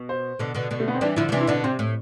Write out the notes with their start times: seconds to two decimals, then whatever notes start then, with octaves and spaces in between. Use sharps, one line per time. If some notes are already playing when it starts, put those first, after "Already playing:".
Already playing: B2
0.09 C5
0.39 B2 D3
0.55 B2 D3
0.71 B2 D3
0.80 A3
0.88 B3
0.94 C4
1.01 E3 G3 D4
1.16 D3 F3 E4
1.29 F3
1.32 C3 E3 D4
1.41 E4
1.47 B2 D3 D4
1.64 C3 C4
1.79 A2